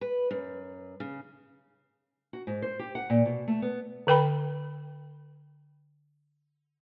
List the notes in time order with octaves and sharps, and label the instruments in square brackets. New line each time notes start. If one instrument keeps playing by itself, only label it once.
[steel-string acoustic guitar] B4
F#2
C#3
[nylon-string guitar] F#4
G#2
C5
G4
F#5
A#2
B2
A3
B3
[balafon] D3 B4 G5 B5